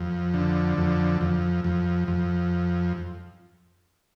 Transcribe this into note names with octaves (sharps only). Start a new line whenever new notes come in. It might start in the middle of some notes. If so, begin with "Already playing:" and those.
Already playing: F2
D3
F2
F2
F2
F2